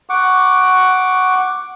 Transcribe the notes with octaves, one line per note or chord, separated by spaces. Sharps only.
F#5 C#6 D6